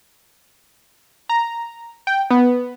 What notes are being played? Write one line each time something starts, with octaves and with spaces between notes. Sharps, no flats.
A#5
G5
B3